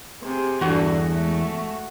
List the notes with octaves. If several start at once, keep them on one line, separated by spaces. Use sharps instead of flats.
C3 G#4
E2 G2 D3 D4 F#4
G#3 A3